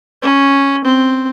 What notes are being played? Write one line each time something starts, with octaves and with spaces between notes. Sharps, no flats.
C#4
C4